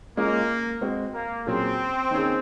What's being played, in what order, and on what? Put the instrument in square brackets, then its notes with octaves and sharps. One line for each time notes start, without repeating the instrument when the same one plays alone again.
[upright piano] G#3 C#4 F4 G#4 [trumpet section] A#3
[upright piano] G#3 C4 F#4
[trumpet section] A#3
[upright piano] A#2 F#3 C#4 G#4 [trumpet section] C4
[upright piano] D#3 A#3 C#4 G#4